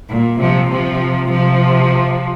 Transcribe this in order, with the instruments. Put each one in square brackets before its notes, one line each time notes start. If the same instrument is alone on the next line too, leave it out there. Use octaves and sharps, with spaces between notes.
[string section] A#2
C3 F3
C3 F3
C3 F3